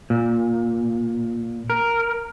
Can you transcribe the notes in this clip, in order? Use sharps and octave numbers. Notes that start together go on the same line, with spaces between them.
A#2
A#4